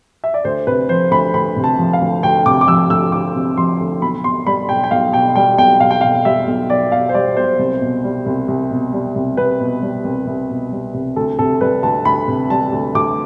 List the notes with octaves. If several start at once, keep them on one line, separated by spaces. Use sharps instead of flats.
E5
D5
D2 C5
C3 B4
F3 C5
D2 B5
D2 B5
C3
A5
F3
F5
D2
D2 G5
C3 D6
D6
F3 E6
D2 E6
D2 D6
C3
F3 C6
D2
B1 B5
B2 C6
G3 B5
B1 G5
G5
B1 F5
B2 G5
G3 G5
B1 G5
B1 F5
G5
B2 F5
G3 E5
B1
B1 D5
B2 F5
C5
G3 D5
B1 C5
C2
B2
G3
C2
C2
B2
G3
C2
C2 B4
B2
G3
C2
C2
B2
G3
C2
D2 A4
C3 A4
G3 B4
D2 A5
D2 B5
C3
G3 A5
D2
D2 D6